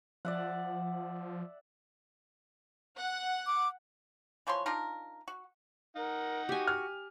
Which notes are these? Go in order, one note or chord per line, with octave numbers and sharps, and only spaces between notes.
F3 D5 E5 F#5
F#5
D6
E3 F3 C#5 C6
D4 D#4 F4 A#4
F#4
D#4 A#4 F#5
F#4 G4 G#5
F6